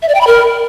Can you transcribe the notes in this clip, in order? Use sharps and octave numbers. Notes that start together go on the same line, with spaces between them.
E5
D5
G5
B5
A#4